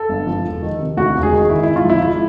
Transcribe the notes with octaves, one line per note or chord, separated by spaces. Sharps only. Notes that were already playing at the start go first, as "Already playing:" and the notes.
Already playing: A4
G1
F3
E1
D#3
C3
D2 F#4
E1
G#4
D#3
G#1 E4
G#1 E4
F4
F3 E4
G#2 E4